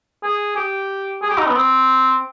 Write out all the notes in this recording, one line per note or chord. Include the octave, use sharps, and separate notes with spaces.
G#4
G4
G#4
G4
D#4
B3
C4